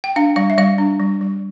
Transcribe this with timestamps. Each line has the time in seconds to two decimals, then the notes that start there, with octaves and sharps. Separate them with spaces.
0.04 G5
0.16 D4 F5
0.36 G3 F5
0.50 E5
0.58 G3 F5
0.78 D4
1.00 G3
1.21 G3